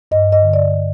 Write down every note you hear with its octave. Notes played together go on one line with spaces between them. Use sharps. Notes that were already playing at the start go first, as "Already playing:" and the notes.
G2 D#5
D#5
D3
D5